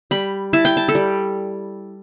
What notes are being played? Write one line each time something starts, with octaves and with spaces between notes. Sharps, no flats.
G3 B5
E4 A5
G5
A5
A4
G3